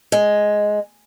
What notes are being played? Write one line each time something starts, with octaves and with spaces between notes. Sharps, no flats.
G#3